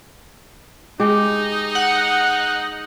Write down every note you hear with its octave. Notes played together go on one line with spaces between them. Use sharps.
G#3 D#4 G4
F#5